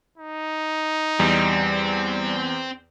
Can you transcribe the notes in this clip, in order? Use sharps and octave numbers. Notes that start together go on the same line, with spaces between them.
D#4
E2 G3 C4